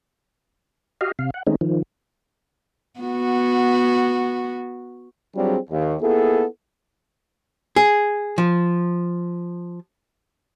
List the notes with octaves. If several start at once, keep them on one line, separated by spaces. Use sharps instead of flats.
F#4 G4 D#5 F5
C3 F5
F#5
D#3 G#3 A3 C4 C#4 D#4
D#3 F3
B3 F#4
F#3 G3 C4 D4 F4 G#4
D#2
A#3 B3 E4 F4 G#4 A4
G#4
F3